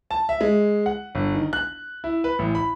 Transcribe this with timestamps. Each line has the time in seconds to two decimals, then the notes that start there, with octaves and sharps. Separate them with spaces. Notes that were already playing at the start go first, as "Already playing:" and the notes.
0.11 A5
0.29 E5
0.41 G#3
0.86 F#5
1.15 G1
1.35 D#3
1.53 F#6
2.04 E4
2.24 B4
2.39 A1
2.55 B5